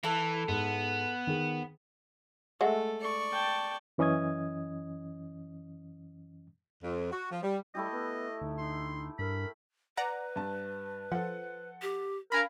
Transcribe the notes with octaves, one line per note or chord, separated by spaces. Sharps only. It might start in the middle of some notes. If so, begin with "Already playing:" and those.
E3 E4 A4
G#2 B3
D#3 G#4
G#3 A3 F#4 A4 E5
D5 C#6
G5 A5
F#2 E3 C#4 D#5 D#6 G#6
F2
F#4
F3
G3
G3 A3 E4 G4 D#5
B3
D2 D#4
D#4 C6
G2 A#4 B5
B4 D5 F#5 A#5
G2 A5
F3 A4 C5 F#5
G4
D4 A#4 F5 G#5 B5